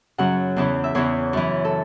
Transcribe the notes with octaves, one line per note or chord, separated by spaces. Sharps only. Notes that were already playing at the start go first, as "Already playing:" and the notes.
F#2 C#3 F#3 F#5
E2 C#3 E3
E5
E2 C#3 E3 C#5
F#2 E3
A4